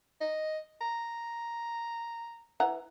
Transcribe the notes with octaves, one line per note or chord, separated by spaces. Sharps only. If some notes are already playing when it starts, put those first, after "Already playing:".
D#5
A#5
E3 F#5 A#5